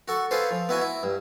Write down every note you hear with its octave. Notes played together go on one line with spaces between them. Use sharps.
F#4 A4 C#6
F4 G#4 A4 B4 C5
F3
B3 E4 F#4 G#5
E4
G2